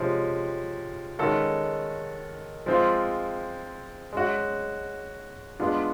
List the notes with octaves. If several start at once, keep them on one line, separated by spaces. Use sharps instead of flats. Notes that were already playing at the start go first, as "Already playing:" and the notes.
Already playing: C3 F3 G#3 C#4
D#3 G#3 C#4 F#4 A4
F3 G#3 C4 F4
G#3 C#4 F#4
G#3 B3 D4 F4